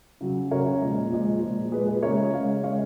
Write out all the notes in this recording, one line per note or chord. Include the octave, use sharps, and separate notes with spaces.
C#3 F#3
C#3 F#3 A#4 C#5
A#2 F3 G#3
A#2 F3 G#3
A#2 F3 G#3
A#2 F3 G#3 G#4 B4
G#4 B4
C#3 G#3 A#4 C#5
C#3 G#3 C#5 F5
C#3 G#3 C#5 F5